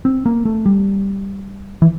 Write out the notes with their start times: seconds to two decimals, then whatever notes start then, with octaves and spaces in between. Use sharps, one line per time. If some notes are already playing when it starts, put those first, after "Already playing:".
0.05 C4
0.26 A#3
0.45 A3
0.66 G3
1.82 E3